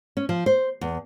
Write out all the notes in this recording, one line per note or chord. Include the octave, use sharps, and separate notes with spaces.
C#4
F3
C5
E2